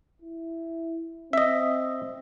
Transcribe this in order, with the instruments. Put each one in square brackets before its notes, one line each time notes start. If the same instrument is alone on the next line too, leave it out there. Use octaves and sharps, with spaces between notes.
[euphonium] E4
[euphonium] C4 [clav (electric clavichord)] D#5 E5